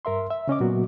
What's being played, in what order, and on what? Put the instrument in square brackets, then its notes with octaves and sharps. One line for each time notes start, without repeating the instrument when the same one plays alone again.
[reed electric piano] G2 A#4 E5 C6
E5
C#3 C#4 D#5 D6
A#2 F#3 B3 F#4